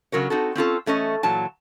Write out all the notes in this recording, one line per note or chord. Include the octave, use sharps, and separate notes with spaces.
C#3 F#3 A#4 C#5
C4 D#4 F#4 A4
C4 C#4 F4 A4
E2 A3 C#4 D#5
A#2 E3 F#3 A5